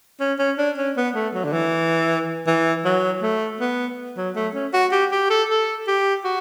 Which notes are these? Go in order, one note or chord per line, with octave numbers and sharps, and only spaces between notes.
C#4
C#4
D4
C#4
B3
A3
F#3
D3
E3
E3
F#3
A3
B3
F#3
A3
C#4
F#4
G4
G4
A4
A4
G4
F#4